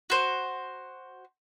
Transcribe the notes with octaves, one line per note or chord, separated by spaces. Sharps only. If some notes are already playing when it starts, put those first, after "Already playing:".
F#4 C5